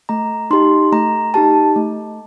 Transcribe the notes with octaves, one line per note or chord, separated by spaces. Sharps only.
A3 A#5
D#4 G4 C6
A3 A#5
D#4 G4 A5
A3